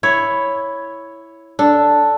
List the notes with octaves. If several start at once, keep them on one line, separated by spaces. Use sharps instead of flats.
E4 C#5
D4 A4